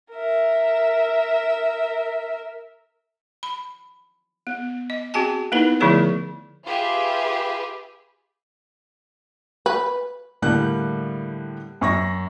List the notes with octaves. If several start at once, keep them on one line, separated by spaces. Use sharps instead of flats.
A#4 E5
B5
B3
D#5
C4 F#4 G#4 G#5 A5
A#3 B3 D#4 E4 A#4 B4
D3 F3 A3 E4 G#4 C#5
F4 G4 G#4 B4 E5
B4
A2 D3 G3 A#3 G5 F#6
F#2 C#6 A#6